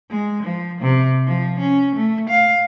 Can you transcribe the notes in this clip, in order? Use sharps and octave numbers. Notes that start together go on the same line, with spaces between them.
G#3
F3
C3
F3
C#4
A3
F5